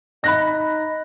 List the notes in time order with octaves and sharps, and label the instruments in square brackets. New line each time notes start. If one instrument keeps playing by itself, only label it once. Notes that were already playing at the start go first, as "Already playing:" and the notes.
[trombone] D#4 [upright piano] B5 F#6 A#6